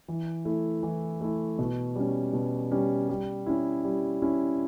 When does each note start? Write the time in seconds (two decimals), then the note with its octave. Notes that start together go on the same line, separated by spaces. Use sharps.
0.08 E3
0.45 A3 E4
0.83 E3
1.21 A3 E4
1.59 B2
1.96 G3 C#4
2.33 B2
2.71 G3 C#4
3.09 G3
3.46 C#4 E4
3.84 G3
4.22 C#4 E4